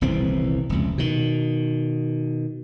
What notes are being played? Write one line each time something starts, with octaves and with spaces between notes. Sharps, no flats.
D#1 C2 E3 C4
F1 C#2
B2 D#3